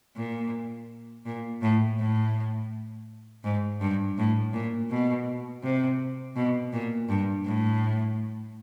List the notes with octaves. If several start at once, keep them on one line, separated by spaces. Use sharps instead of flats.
A#2
A#2
A2
A2
G#2
G2
A2
A#2
B2
C3
B2
A#2
G2
A2